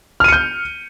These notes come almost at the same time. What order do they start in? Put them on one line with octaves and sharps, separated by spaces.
F6 D#7 C#7 G6